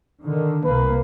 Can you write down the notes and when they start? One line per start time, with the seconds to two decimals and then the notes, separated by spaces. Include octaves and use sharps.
0.24 D3 D#3
0.64 C2 A#3 B4